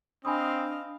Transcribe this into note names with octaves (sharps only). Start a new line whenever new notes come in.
C4 D4 D#5 F5 G#5 B5 D#6